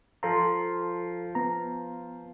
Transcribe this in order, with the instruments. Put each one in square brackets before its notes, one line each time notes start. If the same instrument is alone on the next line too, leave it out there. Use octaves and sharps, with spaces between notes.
[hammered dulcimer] F3 [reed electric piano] A4 A#5
[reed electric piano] B3 A#5